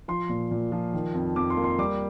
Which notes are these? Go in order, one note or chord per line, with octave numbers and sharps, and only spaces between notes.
F3 C6
A#2
A#2
F3
D#3
F2
F2 D6
C6
A#3
C6
G3 D6